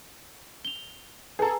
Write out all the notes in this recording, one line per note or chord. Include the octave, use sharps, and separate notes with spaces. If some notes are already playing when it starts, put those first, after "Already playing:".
F7 G7
G#4 A4 B4 G#5 A#5